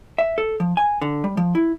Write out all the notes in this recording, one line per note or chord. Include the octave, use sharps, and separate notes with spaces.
E5
A4
F3
G#5
D3
G3
F3
E4